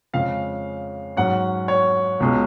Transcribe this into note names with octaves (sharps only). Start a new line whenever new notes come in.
F2 C#3 G#3 C#4 F5
G#2 F#3 C#4 F#5
C#5
C#2 B2 G#3 C#4